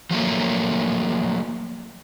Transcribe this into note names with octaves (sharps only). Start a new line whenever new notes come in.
F3 F#3 A3 A#3